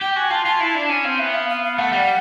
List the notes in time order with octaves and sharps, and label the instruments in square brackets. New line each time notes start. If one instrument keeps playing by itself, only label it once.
[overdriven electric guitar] G4 [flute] G5
[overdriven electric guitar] F#4 [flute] G#5
[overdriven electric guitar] F4 [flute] A5
[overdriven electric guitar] F4 [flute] A5
[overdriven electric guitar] E4
[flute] A5
[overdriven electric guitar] D4
[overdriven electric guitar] C#4 [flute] G#5
[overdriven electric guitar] C4 [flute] F5
[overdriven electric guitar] B3 [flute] E5
[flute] F5
F5
F5
[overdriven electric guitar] A3 [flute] F#5
[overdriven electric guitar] G3